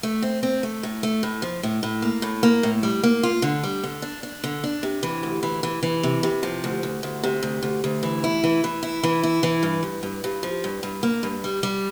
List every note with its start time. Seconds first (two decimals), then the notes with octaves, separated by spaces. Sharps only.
0.03 A3
0.22 C4
0.43 C4
0.63 A3
0.83 A2
1.03 A3
1.23 A2
1.42 F3
1.63 A2
1.83 A2
2.02 A#3
2.22 A2
2.43 A#3
2.63 A2
2.83 G3
3.03 A#3
3.23 F4
3.42 D3
3.64 G3
3.84 D3
4.02 D4
4.23 D4
4.44 D3
4.64 D4
4.83 C3
5.03 E3
5.23 D2
5.43 E3
5.63 E3
5.83 E3
6.03 C3
6.23 C3
6.43 F3
6.64 D2
6.83 D2
7.03 D2
7.24 C3
7.43 D2
7.63 D2
7.84 D2
8.03 E3
8.24 E4
8.44 E3
8.64 E3
8.83 E4
9.03 E3
9.23 E4
9.43 E3
9.63 G2
9.83 G2
10.03 G2
10.24 G2
10.43 F3
10.64 G2
10.83 G2
11.03 A#3
11.23 G2
11.44 G3
11.63 G3